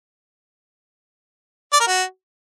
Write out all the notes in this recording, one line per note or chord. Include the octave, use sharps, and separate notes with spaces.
D5
A#4
F#4